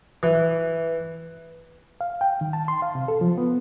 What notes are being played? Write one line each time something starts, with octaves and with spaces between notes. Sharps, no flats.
E3
F5
G5
D#3
A5
C6
F5
C3
A4
F3
B3